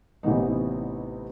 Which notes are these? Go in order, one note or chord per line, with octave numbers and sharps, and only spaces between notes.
A1 C3 E3 B3 D#4